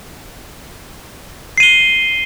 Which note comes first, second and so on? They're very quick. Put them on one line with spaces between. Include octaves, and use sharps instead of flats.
C7 D#7 G7